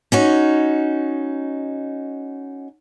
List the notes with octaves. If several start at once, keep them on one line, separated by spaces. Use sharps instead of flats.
C#4 D#4 F#4